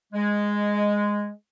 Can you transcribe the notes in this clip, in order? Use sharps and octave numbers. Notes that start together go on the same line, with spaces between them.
G#3